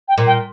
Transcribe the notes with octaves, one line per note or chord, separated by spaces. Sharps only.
G5
A#2
G5